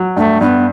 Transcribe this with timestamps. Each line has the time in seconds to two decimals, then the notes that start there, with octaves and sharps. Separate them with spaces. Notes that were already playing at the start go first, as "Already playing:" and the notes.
Already playing: F#3
0.17 G2 A3
0.41 G2 B3